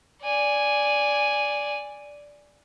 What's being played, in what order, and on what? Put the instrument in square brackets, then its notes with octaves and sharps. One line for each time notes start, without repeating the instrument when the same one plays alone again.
[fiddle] D5 G#5